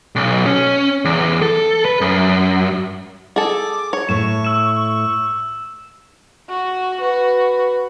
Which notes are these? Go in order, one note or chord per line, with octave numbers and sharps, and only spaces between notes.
B1
C#4
E2
A4
B4
F#2
G#4 A4 D6
C#5 C#6
A2 A3 C#6 E7
E6 E7
F#4
F#4 B4